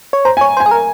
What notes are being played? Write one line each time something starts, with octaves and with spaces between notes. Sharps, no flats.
C#5
C5 A#5
G#5
C#5
C5
G#5
G#4
A#4